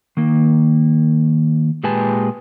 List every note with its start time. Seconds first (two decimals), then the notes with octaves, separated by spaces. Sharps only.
0.17 D#3 A#3
1.83 A#2 G#3 G4 B4 G#5 A5